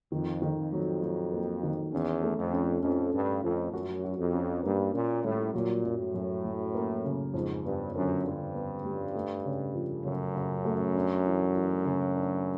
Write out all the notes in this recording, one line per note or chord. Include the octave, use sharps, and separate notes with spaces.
F2 D#3
D#3
F2
F#3
F#3
A#3
D#3
E2 C#4
A3
F2
C#4
F2 C#4
G2 C#4
F2 F3
F#2 F#4
F#4
F2
C#4
G2 A#3
A#2 C#4
A2 G3
A#2 F#3
F#2
A2
F#2
F#3
A#3
C#3
F2 G#2
G2 B3
F#2 D3
G2 D3
B3
G3
A3
C#3
F3
F#2 C#3
C#3
A3
D4
E3
E3
C#3
D4